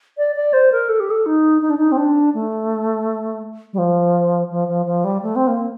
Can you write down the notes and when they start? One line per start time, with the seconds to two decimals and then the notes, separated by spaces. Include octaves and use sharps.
0.18 D5
0.36 D5
0.53 C5
0.72 A#4
0.89 A4
1.00 G4
1.10 A4
1.26 D#4
1.62 D#4
1.70 D4
1.77 D#4
1.92 C4
1.97 D4
2.34 A3
3.73 G3
3.78 F3
4.51 F3
4.68 F3
4.86 F3
5.04 G3
5.22 A3
5.36 C4
5.47 A#3